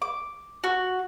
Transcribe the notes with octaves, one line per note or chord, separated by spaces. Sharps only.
D6
F#4